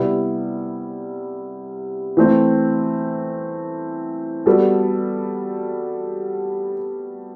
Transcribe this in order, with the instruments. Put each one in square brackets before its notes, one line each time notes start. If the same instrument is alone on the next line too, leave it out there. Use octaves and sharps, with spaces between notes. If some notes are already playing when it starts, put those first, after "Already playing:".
Already playing: [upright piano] C3 G3 B3 E4
E3 A3 C4
G3 B3 F#4 A4